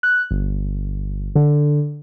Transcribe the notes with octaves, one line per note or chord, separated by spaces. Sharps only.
F#6
G1
D3